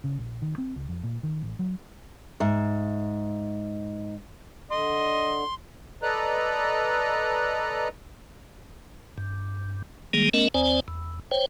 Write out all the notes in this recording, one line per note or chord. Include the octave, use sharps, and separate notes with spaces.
C#3
A#1
D#3
C4
C#2
F2
A#2
D#3
A1
F#3
G#2 E5
D3 D#5 C6
A4 B4 D5 D#5 A#5 F#6
G2
D#3 G3 G#3 A#3 G#4
A3 B3 C#4 A#4 D#5
D#2 C4 C5 D5 G#5
E2
C5 C#5 G5